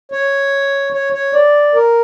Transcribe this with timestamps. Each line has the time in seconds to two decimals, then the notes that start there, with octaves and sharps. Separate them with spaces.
0.12 C#5
0.93 C#5
1.13 C#5
1.33 D5
1.74 A#4